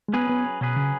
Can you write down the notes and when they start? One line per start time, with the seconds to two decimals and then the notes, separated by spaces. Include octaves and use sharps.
0.08 G#3
0.13 F#3 B3 C#4 G#4 B4
0.29 B3
0.61 B2 F#3 C#4 G#4 B4
0.76 C#3